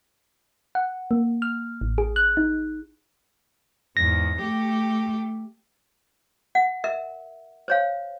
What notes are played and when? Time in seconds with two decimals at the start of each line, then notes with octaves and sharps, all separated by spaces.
0.75 F#5
1.11 A#3
1.42 F6
1.81 A1
1.98 G#4
2.16 F#6
2.37 D#4
3.97 E2 G#2 A#6
4.39 A3 G4
6.55 F#5
6.84 A#4 E5
7.68 C5 C#5 F5